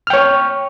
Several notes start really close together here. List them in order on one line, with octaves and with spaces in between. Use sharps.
F6 G5 C#5 C#6